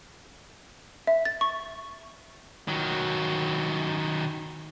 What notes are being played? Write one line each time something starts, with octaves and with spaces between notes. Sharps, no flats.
E5
A6
C#6
D#3 F#3